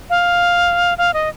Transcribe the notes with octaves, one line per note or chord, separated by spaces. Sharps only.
F5
F5
D#5